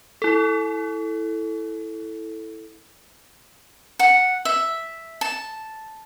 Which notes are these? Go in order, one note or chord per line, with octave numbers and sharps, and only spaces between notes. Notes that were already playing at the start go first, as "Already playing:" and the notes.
E4 A4
F#5
E5
A5